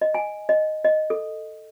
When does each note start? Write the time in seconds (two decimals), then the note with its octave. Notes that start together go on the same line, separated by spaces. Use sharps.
0.01 D#5
0.14 G#5
0.49 D#5
0.84 D#5
1.10 A4